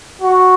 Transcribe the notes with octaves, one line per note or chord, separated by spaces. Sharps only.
F#4